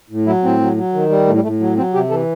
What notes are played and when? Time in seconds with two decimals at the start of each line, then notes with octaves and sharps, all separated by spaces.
0.10 A2
0.26 F#3 E4
0.43 A2 C4
0.60 F#3
0.77 F#3
0.94 D#3
1.10 G3
1.27 A2 A3
1.35 G3
1.43 A2 A3
1.60 F#3
1.77 F#3 C4
1.94 C3 G4
2.10 E3 A4